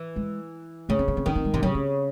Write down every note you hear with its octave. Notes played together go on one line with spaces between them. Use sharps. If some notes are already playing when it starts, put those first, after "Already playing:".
Already playing: E3
G#3
C#3 A3
C4
C#4
C4
D#3 C#4
C4
G#3
C3 E3
C#3 F#3
C#4